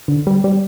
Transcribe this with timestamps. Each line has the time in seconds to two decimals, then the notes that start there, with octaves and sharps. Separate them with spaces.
0.08 D3
0.27 G3
0.44 G3